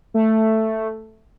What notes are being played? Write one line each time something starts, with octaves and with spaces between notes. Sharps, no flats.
A3